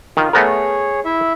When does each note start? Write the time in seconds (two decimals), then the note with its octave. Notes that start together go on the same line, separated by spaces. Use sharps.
0.17 D#3 F4
0.33 A3 B3 G#4 A#4 C#5
1.05 E4 E5